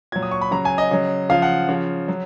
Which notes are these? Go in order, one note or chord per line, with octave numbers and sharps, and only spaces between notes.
A#2 F#3 G#6
D#6
C#6
B5
C#3 F#3 A#5
G#5
D#5
C#3 F#3
C#3 F3 F5
F#5
C#3 F3
F#3